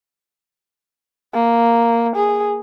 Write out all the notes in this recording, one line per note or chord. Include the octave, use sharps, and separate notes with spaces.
A#3
G#4